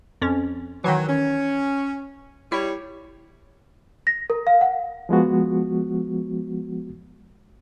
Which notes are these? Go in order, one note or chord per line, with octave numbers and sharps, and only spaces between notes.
F2 C#4
D#3 E3 F#3
C#4
G3 E4 C#5
A#6
A#4
F5
F#5
F3 G#3 B3 F#4